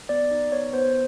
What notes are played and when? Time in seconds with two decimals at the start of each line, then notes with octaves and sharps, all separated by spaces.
0.09 B3 D5
0.31 D#4
0.52 B3 C#5
0.73 B3 C5